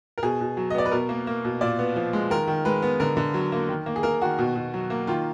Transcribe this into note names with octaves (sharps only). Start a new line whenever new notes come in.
A#4
B2 G#4
B2
F#3
D#5
B3 D5
B4
B2 A#4
A#3
A#3
B2
A#2 D5
B3
F3
G#3
D#3 A#4
D#3
G#3 B4
B3
D3 A#4
D3
F#3
A#3
D#3
A#3
G#4
A#3 A#4
D#3 F#4
B2
B2
F#3
A#3
D#3 F4